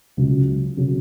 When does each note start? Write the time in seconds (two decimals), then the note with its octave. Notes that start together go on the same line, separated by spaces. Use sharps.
0.17 C#2 C#3 F#3
0.77 C#3 F#3